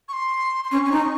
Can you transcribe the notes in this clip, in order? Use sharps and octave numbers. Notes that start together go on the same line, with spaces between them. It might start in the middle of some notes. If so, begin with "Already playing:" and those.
C#6
C6
C6
C#4 C#6
C#4
D#4